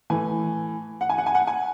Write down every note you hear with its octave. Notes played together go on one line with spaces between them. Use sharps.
A2 E3 G#5
F#5
G#5
F#5
G#5
F#5
G#5